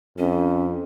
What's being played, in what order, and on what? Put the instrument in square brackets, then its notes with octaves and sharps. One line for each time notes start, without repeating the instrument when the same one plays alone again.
[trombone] F2 [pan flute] C#4